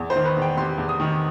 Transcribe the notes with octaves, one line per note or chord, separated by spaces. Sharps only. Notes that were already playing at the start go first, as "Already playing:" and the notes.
Already playing: E2
C5
D#3
B4
E2
G5
C3 C6
E2
D#6
D#3